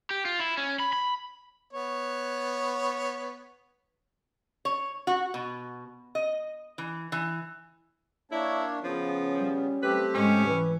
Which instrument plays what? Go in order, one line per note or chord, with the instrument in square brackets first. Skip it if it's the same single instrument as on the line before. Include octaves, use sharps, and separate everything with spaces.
[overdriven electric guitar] G4
F4
E4
C#4
B5
B5
[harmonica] B3 C#5
[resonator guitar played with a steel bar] C#5
F#4
B2
D#5
E3
E3
[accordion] A#3 D4 C#5 [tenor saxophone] E4
[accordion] C#3 B3 [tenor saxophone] F3 [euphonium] C#4
[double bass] G3
[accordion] A3 C4 G4 [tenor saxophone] B4
[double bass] G#2 G#3 [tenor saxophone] C#4
[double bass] E3 [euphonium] B4